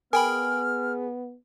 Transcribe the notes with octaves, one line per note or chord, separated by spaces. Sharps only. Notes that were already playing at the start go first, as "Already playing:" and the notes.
B3 G#4 A#4 G5 B5 F6